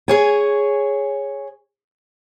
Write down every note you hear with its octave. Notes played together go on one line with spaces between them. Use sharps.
G#4 C#5 G#5